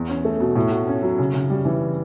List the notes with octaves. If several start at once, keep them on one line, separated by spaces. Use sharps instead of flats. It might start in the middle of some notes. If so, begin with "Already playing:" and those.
Already playing: E2
C#4
A3
B2
A2
F#4
C#4
F#3
C#3
C#3
G3
E3